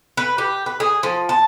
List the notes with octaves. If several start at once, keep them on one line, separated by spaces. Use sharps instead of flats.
B4
G4
B4
G#4
F3
A5